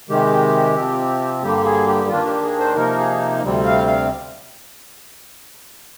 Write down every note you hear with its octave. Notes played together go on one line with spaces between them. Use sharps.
C3 D#3 G#3 G4
C3 F3 C4
G2 D3 G3 A#3 G4
G#4
G4
D#2 D#3 A#3 D4 F4
G4
G#4
C5
C3 F3 A#3 D#4 A#4
G#4
D2 C3 G3 C4
F5
F5